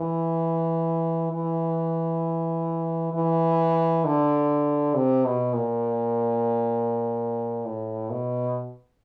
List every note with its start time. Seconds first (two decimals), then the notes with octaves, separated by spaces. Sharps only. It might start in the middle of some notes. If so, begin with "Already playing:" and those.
Already playing: E3
1.33 E3
3.14 E3
4.05 D3
4.94 C3
5.25 B2
5.54 A#2
7.65 A2
8.10 B2